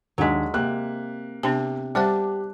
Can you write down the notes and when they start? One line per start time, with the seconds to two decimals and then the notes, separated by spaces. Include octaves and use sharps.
0.18 D#2 F#3 G#3 D4 B6
0.54 C3 A#3 F#6
1.43 C3 B3 D4 A5
1.95 G3 D4 G4 C5 F#5 F#6